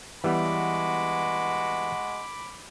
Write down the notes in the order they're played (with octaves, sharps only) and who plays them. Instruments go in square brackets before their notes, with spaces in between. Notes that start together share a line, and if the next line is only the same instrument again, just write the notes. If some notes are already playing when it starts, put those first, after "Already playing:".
[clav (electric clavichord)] E3 G3 B3 [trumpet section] G#3 F#4 [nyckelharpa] B5 D6